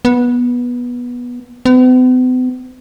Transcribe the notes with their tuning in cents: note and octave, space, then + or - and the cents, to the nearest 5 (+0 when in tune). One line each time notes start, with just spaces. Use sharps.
B3 -15
B3 +45